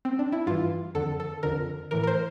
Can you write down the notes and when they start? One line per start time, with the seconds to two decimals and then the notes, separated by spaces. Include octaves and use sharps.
0.05 C4
0.19 D4
0.32 E4
0.47 G2 E3 F4
0.95 F2 D3 A4
1.20 A4
1.43 F2 D3 A#4
1.91 A2 E3 A#4
2.03 A#4
2.07 C5